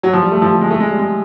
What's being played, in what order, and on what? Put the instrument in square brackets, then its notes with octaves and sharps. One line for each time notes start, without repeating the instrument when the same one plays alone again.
[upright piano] F#3
F3
G3
A3
F3
G3
G#3
A3
G#3
G3
G#3